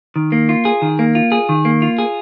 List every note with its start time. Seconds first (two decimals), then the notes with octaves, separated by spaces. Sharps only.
0.16 D#3
0.32 A#3
0.49 F4
0.65 G#4
0.82 D#3
0.99 A#3
1.15 F4
1.32 G#4
1.49 D#3
1.65 A#3
1.82 F4
1.98 G#4